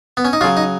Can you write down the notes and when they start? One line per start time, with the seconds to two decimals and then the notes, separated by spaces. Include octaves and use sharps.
0.17 B3
0.25 C#4
0.33 D#4
0.41 C#3 F#3 F4
0.57 D#4